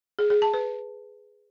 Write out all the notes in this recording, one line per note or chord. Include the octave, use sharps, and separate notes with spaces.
G#4
G#4
A5
B4